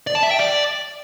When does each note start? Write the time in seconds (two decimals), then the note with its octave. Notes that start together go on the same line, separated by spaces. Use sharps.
0.07 D5
0.15 A5
0.23 E5
0.31 G5
0.39 D5